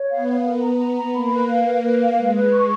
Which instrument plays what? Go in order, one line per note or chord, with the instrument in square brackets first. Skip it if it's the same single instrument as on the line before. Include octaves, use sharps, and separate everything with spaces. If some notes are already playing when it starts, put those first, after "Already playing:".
Already playing: [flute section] C#5
[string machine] B3 [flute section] F5
[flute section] F5
A#4
A#5
A#5
A#5
[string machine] A#3 [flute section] B5
[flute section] B4
F5
B4
B4
F5
[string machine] G#3 [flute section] B4
[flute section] B4
C#6